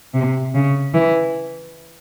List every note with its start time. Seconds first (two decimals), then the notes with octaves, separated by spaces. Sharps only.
0.14 C3
0.54 C#3
0.94 E3